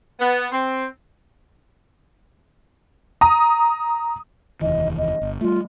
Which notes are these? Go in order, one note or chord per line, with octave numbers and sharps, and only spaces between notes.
B3
C4
A#5 D#6
F1 D#2 E3 D#5
D#5
G1
G3 A3 F4